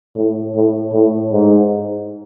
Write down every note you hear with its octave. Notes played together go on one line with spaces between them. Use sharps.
A2
A2
A2
G#2